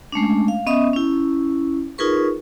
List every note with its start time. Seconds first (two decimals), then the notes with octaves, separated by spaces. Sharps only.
0.12 G#3 A3 C#4 D4
0.48 F5
0.67 B3 C#4 D#5 E5 D#6
0.93 C#4 E4
1.98 D#4 F4 G#4 A#4 B4 C#6